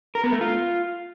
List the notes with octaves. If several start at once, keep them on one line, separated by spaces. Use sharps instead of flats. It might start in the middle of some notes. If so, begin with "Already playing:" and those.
A#4
B3
A3
F4